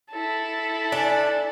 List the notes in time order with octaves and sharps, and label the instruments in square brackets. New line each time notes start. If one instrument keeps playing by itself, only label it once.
[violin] E4 A4
[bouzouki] D4 [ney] G#5